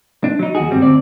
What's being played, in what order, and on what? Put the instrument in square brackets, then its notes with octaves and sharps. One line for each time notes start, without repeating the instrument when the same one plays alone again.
[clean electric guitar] D4
F#3 D#4
D#2 F#4 G#4
G2 G3 C4
D2 C4 D5